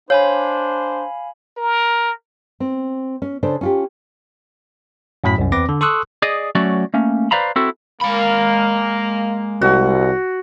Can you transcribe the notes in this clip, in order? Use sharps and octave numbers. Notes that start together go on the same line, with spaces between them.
D4 C5 C#5 F5 G#5 B5
A#4
C4
C#4
C#3 D4 A4 C5
C#4 F4 G4
F#2 A2 F#3 B5 B6
C2 F#2
E2 C4 B4 D6 A#6
D3
A4 C6 C#6 D#6 E6 F#6
G#4 D5 D#5
F#3 A3 C#4 F#4 D5
A3 A#3 C#4
B4 C5 D5 F5 A#5 B5
C4 E4 F#4 A4
G#3 A#3 B5
C2 F#4